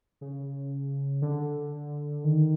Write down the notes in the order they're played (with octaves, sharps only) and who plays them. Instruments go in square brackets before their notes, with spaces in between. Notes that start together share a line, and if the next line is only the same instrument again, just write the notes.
[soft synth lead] C#3
D3
D#3